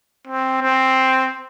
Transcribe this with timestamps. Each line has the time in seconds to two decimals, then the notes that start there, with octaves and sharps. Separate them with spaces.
0.28 C4
0.62 C4